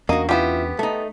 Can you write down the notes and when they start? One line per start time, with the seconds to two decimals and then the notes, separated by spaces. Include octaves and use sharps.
0.09 E2 A#3 C#4 D4 F#4 D#5
0.29 B3 E4 F4 G4
0.79 A3 D#4